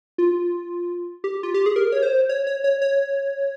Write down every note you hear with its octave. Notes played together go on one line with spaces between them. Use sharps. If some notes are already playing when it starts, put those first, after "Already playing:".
F4
G4
F4
G4
G#4
A#4
C#5
C5
C#5
C#5
C#5
C#5